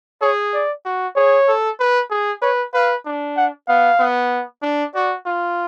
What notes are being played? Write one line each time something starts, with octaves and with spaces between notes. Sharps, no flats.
G#4 C#5
D5
F#4
G#4 C#5
A4
B4
G#4
B4 C#5
B4 F5
D4
F#5
B3 F5
B3
D4
F#4 D5
F4